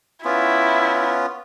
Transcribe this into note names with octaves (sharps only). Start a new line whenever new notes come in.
B3 C#4 E4 F4